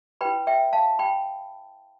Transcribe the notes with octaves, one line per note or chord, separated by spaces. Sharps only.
E4 B4 G5 B5
E5 G5
F5 A5
G5 B5